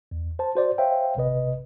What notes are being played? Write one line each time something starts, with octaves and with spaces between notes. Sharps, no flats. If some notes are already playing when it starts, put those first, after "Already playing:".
E2
C5 A5
F#4 C5 D5
C5 C#5 E5 F5 G5
G#1 C3 B4 D#5